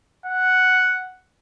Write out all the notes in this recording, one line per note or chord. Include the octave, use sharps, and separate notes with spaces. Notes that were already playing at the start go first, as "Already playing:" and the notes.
F#5